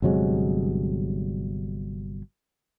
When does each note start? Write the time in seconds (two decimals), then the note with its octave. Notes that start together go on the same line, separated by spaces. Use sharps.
0.02 G1 C3 F#3 G#3